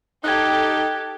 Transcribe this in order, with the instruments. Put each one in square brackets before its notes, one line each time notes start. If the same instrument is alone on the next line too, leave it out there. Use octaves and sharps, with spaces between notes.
[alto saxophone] D#4 [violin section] G4 A4 [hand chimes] F#6 G#6